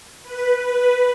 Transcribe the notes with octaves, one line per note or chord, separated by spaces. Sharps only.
B4
B4